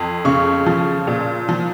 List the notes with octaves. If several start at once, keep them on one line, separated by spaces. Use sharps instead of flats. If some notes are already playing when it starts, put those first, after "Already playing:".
Already playing: F2
C#3 C#6
F3
A#2
F3